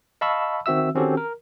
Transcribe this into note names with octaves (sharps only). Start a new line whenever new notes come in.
D#5 F5 A5 B5 C#6 E6
D#3 C4 F#4 E5 E6
D#3 C4 C#4 F#4 G4 A4
A#4